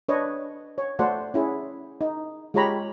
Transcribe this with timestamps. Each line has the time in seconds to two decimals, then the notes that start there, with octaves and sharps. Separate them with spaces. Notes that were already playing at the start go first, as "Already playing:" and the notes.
0.09 D4 B4 C#5 D#5
0.78 C#5
0.99 A3 F#4 A4 C5 D5 F#5
1.34 C#4 E4 G#4
2.01 D#4
2.54 G#3 F4 G4 C#5 A#5 B5